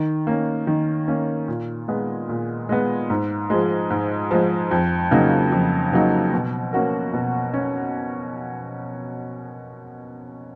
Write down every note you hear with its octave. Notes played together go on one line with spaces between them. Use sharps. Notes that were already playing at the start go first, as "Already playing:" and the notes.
Already playing: D#3
A#3 C#4
D#3
A#3 C#4
A#2
G#3 B3
A#2
G#3 B3
G#2
F3 G#3
G#2
F3 G#3
F2
C#3 F#3 A#3 D#4
F2
C#3 F#3 A#3 D#4
B2
A#3 C#4 F#4 A#4
B2
C#4